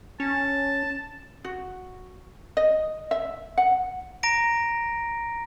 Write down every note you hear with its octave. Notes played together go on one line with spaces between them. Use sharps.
C#4 A5
F#4
D#5
E5
F#5
A#5 A#6 D7